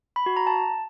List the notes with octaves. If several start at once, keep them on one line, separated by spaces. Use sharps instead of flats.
B5
F#4
A#5
A5